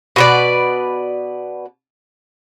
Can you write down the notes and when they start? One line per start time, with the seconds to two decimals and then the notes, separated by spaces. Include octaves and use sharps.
0.16 B2 B4 D5